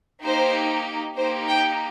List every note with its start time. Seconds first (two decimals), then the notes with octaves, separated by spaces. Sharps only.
0.24 A#3 D#4 G4 C5
1.17 A#3 D#4 G4 C5
1.48 G5